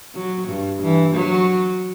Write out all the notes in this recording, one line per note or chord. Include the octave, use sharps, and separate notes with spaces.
F#3
G2
E3
F#3